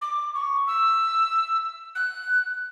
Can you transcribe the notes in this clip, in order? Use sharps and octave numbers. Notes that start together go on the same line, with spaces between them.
D6
C#6
E6
F#6